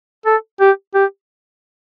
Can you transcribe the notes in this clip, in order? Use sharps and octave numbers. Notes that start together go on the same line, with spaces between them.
A4
G4
G4